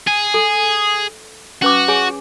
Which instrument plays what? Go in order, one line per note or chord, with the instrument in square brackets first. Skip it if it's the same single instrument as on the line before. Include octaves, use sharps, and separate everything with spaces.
[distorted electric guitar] G#4
[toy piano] A4
[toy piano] C#4 B4 D6 [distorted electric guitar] F#4
[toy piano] G#4 C#5 G#5